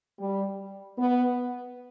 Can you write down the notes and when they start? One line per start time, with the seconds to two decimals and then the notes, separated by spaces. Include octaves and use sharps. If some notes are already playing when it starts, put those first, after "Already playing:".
0.20 G3
0.98 B3